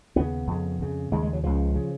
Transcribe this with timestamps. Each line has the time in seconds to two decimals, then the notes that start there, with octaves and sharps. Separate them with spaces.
0.16 D#2 C#3 B3
0.47 F2 C#3
0.79 F2 C#3
1.11 D#2 C#3 G#3
1.23 G#3
1.33 F#3
1.44 C#2 C#3 F3
1.75 C#3